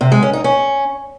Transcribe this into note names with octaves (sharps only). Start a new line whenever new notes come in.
C3
G#3
C#4
D#4
C#4